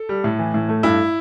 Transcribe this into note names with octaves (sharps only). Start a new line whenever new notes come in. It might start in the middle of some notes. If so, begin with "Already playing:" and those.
Already playing: A4
G3
A2
E3
A2
A3
G2 E4